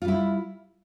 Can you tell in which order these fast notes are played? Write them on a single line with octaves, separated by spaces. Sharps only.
F4 G3 E4